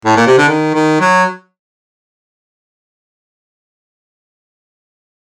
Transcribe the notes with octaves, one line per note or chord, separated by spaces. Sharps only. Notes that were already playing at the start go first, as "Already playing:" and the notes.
A2
A#2
C3
D3
D#3
D#3
F#3